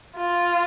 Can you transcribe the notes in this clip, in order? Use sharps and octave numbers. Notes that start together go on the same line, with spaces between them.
F4